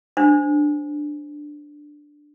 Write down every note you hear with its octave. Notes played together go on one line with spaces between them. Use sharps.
D4 C5